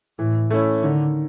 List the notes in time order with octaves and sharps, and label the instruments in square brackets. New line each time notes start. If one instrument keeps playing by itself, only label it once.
[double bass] A2 [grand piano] E3
[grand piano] A3 C#4 E4
[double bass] D3 [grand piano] D#3